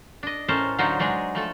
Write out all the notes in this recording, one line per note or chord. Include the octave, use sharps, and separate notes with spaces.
D4 D#5
A2 C#4 A4 A#4 C5 A5
D3 F#3 D#4 F4 C5 F#5
F#3 G#3 D4 D#4 G#4
F3 A3 A4